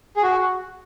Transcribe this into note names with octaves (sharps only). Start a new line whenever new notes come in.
G#4
F#4